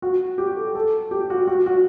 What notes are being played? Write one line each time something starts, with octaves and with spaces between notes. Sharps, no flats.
F#4
G4
A4
A4
G4
F#4
F#4
F#4